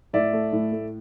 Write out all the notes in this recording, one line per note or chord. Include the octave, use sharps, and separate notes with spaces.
A2 D5 E5
A3
A2
A3